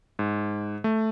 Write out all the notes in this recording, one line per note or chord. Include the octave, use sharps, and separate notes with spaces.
G#2
A3